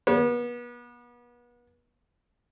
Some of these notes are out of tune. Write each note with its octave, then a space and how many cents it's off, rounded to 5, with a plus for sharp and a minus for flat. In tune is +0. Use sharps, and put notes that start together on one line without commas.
B3 -35